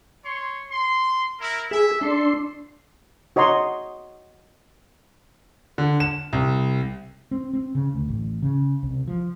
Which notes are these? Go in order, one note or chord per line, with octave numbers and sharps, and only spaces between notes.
C#5 C6
C6
E4 A#4
G#4 E5
D4 A4 C6
F#4 C#5 D#5 A#5 C6
D3
E7
C2
C4
C4
C#3
D2
A1
C#3
C2
F3